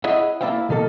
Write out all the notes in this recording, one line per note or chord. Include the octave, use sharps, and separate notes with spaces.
E4 G#4 C#5 D#5 E5 F#5
A#3 E4 D5 E5 F5 G5
B1 D#3 A#3 A4